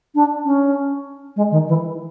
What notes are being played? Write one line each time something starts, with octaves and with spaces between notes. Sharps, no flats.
D4
C#4
G#3
D#3
E3